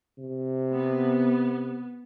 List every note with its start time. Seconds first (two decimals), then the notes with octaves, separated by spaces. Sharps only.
0.18 C3
0.73 B3